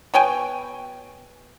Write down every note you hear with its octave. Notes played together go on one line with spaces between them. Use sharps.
B2 C#5 G5 G#5